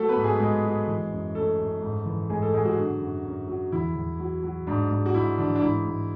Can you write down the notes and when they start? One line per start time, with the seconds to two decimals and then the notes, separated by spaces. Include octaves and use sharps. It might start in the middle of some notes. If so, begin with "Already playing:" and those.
Already playing: F#3 A3 A4
0.09 B3 B4
0.16 G#2
0.24 G#3 G#4
0.40 G#2 G#3 G#4
0.64 F#3
0.88 E3
1.12 F#2
1.35 F#2 A3 A4
1.59 F#2
1.82 G#2
2.06 E3
2.30 G#2 G#3 G#4
2.42 A3 A4
2.54 G#2 G#3 G#4
2.65 F#3 F#4
2.77 D3
3.01 F#2
3.25 F#2
3.48 F#3
3.72 E2 E4
3.96 E2
4.19 F#3
4.43 F#3
4.67 G#2 D4
4.91 G#2
5.06 F#4
5.14 G#2 E4
5.38 E3 D4
5.55 D4
5.62 G#2 E4
5.86 G#2